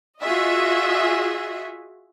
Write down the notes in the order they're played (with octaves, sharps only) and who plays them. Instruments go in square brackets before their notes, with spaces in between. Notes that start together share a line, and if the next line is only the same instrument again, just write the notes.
[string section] F4 F#4 G#4 D#5 E5